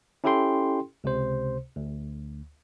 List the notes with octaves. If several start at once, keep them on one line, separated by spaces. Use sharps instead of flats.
C#4 E4 G4 A4 G5 C6
C#2 C3 C5
D2